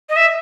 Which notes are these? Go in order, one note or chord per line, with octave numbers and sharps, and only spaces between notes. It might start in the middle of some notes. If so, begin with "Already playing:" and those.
D#5
E5